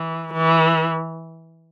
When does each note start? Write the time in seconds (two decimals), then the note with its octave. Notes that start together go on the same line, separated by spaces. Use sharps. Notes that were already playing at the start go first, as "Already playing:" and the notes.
Already playing: E3
0.34 E3